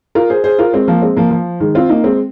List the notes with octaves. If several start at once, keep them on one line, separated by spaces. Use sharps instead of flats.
F4 A#4
G#4 C5
G#4 C5
F4 A#4
G#3 C4
F3 A#3
G#3 C4
F3 A#3
F3
D#3 G#3
C4 F4
A#3 D#4
G#3 C4